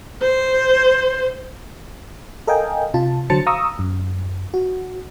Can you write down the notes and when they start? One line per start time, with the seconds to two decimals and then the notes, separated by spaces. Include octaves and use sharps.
0.22 C5
2.47 A4 A#4 D#5 F5 G5 G#5
2.94 C3 F4 A5
3.30 D3 F#3 C5 A5 A6 C#7
3.46 F5 A#5 C#6 D#6 E6
3.79 F#2
4.54 F#4